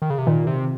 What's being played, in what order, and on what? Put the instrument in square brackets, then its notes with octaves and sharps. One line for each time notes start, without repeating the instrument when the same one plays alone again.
[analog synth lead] D#3
C#3
C3
[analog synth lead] A#2 [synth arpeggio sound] D#3
[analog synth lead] C3